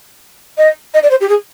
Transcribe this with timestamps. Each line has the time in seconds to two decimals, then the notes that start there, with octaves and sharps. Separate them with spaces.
0.57 D#5
0.94 D#5
1.02 D5
1.10 C5
1.20 G4
1.29 G#4